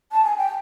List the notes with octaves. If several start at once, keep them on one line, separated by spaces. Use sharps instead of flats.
A5
G#5
G5